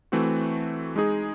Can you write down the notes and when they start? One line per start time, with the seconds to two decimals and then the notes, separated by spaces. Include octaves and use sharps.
0.12 E3 A3 C4 F#4
0.96 G#3 D#4 G#4